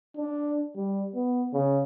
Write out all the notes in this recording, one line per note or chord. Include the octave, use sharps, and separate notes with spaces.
D4
G3
B3
C#3